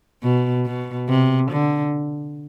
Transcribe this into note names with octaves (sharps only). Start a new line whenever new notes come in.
B2
B2
C3
D3